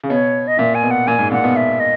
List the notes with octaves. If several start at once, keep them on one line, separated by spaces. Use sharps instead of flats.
C#3
B2 C#5
D#5
A#2 E5
G#5
B2
F#5
A#2 G#5
G#2
A#2 F#5
B2
E5
D#5